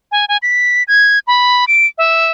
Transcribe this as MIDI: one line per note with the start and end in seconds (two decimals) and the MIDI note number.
0.12 0.25 80
0.29 0.37 80
0.42 0.83 95
0.88 1.19 92
1.27 1.65 83
1.68 1.86 98
1.98 2.32 76